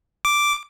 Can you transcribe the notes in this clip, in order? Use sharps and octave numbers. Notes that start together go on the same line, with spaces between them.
D6